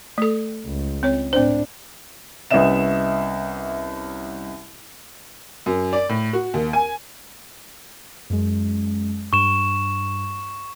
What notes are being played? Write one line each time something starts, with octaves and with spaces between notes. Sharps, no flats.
A3 A4
C#2
C4 C#5
A2 C4 D4 C5
C2 B3 C#4 D#5 E5 E7
F#2
D5
A2
F#4
D#2
G#5
F#2 G#3
G2 C#6 E7